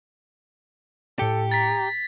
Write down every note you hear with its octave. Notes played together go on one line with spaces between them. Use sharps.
A2 G4 A4 C#7
A#5 A6 B6